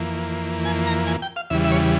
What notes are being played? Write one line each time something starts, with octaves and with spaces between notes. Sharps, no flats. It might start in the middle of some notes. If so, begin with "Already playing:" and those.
Already playing: F2 E3 A#3
G#5
A#5
G#5
G5
F5
E2 C#3 E3 G3 E5
E5
C#5